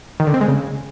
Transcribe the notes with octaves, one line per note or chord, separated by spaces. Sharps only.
D#3
D3
C4
G#3
C#3